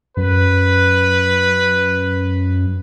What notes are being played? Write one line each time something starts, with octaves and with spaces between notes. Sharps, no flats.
F#2 B4